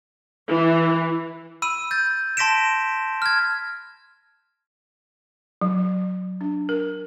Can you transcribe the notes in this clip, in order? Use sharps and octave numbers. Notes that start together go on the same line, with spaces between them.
E3
B5 E6 D#7
G6 A6
A5 C6 A#6 B6 D7 E7
F6 G#6
F#3
D4
A#4